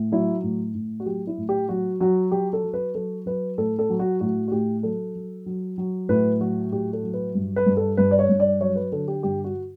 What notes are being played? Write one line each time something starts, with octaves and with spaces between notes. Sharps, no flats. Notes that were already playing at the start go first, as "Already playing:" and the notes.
Already playing: A2
F#3 E4
A2
A2
F#4
F#3 G4
E4
A2
G4
F#3 F#4
F#3 F#4
F#3 G4
A4
F#3
B4
F#3 A4
F#3 B4
A2 A4
A4
F#3
F#4
A2 F#4
F#4
A2 G4
F#3 A4
F#3
F#3
F#3
A2 B4
F#3 F#4
A2 G4
A4
F#3
B4
G2
B4
G2
A4
G2 B4
D5
C#5
G2
D5
F#3 C#5
B4
D3 A4
G4
G2 G4
F#4